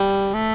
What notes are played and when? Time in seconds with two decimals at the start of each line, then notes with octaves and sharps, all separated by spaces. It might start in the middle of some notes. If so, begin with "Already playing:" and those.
Already playing: G3
0.34 A3